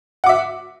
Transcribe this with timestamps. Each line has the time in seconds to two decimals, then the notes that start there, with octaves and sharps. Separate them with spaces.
0.24 F#5
0.26 D6
0.29 E5